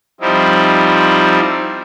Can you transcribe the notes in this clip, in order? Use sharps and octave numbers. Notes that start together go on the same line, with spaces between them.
F3 G3 C4 D#4 E4